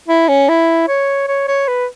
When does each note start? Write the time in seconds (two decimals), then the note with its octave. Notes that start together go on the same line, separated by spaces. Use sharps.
0.08 E4
0.28 C#4
0.49 E4
0.88 C#5
1.28 C#5
1.48 C#5
1.68 B4